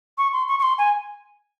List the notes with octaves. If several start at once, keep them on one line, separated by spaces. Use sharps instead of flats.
C#6
C6
C#6
C#6
C6
G#5